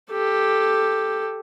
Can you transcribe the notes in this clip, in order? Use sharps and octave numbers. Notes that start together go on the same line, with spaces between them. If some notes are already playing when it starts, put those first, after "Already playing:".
G4 A4